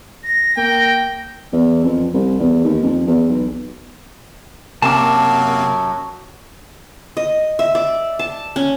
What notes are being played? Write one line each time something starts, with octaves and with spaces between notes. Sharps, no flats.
A#6
A#3 G5
E2
F2
C2
E2
D#2
F2
E2
B1
F#2 C3 F#3 A#3 F#4 A5 D6
D#5
E5
D5
A5
C#4